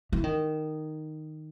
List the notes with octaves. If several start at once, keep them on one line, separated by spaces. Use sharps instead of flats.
E3
D#3